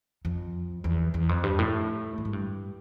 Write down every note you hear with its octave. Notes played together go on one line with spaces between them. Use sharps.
F2
E2
E2
F2
G2
A2
A2
G#2
G2